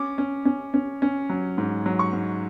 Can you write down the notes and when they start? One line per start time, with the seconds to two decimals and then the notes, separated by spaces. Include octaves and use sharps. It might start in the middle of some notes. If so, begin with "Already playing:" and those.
Already playing: C#4 D6
0.18 C#4
0.45 C#4
0.74 C#4
1.02 C#4
1.30 F#3
1.58 G#2
1.86 F#3
1.99 C#6
2.13 G#2